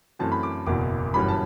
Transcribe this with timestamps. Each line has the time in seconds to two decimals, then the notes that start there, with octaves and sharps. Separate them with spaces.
0.19 F#2 E3 A3 C4 A5
0.32 B5
0.43 D6
0.66 F#1 E2 B2 D6
1.13 G1 F#2 E3 G3 B5
1.28 A5